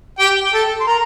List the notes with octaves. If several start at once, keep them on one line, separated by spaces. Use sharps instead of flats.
G4 G5
G5
A4 A5
C6
A#4 A#5